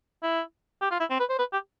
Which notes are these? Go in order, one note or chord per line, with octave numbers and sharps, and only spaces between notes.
E4
G4
F4
E4
C4
B4
C5
B4
G4